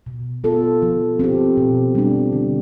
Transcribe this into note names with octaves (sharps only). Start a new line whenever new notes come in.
B2
B3 F4 A4
F3
C4 G4
B2
G3 D4
D3